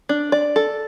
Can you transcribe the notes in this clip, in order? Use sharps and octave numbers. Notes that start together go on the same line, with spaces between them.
D4
D5
A4